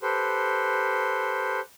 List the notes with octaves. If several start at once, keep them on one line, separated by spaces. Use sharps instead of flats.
G4 A4 B4 C5